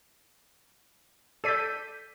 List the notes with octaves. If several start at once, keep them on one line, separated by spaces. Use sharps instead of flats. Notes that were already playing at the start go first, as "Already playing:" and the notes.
A4 D5 G6 B6 D#7